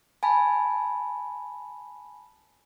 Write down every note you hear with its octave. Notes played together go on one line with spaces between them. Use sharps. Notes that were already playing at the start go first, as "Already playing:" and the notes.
G#5 A5 B5